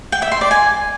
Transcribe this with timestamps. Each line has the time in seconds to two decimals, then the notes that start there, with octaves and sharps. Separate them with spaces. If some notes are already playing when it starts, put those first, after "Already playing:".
0.12 G5
0.22 E5
0.32 C6
0.41 D5
0.51 G#5